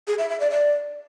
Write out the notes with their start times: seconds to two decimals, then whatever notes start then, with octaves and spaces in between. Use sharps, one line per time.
0.08 G#4
0.18 E5
0.29 E5
0.40 D5
0.51 D5